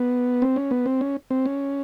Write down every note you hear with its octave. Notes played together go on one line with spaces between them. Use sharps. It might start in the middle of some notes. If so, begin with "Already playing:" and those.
Already playing: B3
C4
C#4
B3
C4
C#4
C4
C#4